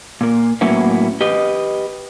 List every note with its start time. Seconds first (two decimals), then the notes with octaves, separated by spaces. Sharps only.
0.21 A#2 A#3
0.61 A2 F#3 A#3 B3 C#4 E4
1.21 G4 B4 D#5